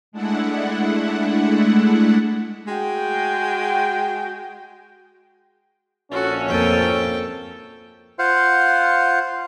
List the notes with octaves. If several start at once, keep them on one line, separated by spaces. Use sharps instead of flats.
G#3 A3 D4 E4 F#5
G#3 F#4 G5
A#1 C#4 F#4 A4
F2 A#3 A4 G5
F4 C5 F5 F#5